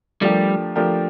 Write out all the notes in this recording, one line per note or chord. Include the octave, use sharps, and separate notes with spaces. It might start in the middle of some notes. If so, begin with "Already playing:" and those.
F3 G3 A3 D4 G4 A#4
F3 A3 D4 G4 A#4